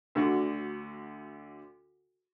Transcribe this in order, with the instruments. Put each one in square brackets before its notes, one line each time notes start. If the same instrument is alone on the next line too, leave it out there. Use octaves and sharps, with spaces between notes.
[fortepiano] D2 D3 F#4